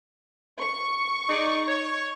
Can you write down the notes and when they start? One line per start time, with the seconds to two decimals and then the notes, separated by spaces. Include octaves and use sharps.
0.60 C#6
1.29 D#4 G#4 D5
1.68 C#5